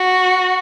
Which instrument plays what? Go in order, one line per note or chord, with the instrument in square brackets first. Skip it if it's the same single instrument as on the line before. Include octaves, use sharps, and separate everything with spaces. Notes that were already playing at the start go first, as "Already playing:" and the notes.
Already playing: [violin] F#4